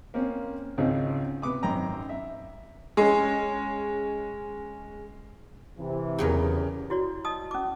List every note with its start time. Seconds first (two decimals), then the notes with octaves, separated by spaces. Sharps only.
0.14 A#3 C4 C#4
0.78 G#1 C#2 C#3 C4 D#4
1.42 C3 B3 D6 D#6
1.62 G#1 F#2 G5 A#5 B5
2.09 E5
2.97 G#3 C#4
5.79 C3 E3
6.19 E2 C#3 F#3 G4 G#4 A#4 B4
6.90 E4 F#4 C#5 D5
7.25 D#5 A5 D#6
7.51 C#4 D6